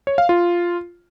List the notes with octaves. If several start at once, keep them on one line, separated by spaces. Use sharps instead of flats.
C#5
F5
F4